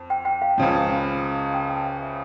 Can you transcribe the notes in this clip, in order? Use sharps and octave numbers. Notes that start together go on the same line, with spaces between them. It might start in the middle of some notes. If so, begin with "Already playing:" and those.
Already playing: F2
G5
G5
F5
C#2 C#3 F3
G5
A5
F5
E5